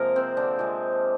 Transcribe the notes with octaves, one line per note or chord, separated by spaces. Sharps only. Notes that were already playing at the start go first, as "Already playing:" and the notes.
Already playing: C3 F3 G#3 A#3 A#4
C4 C5
D3 D4
C3 F3 G#3